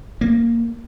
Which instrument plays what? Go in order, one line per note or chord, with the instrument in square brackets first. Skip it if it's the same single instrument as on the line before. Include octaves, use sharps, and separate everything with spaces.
[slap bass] A#3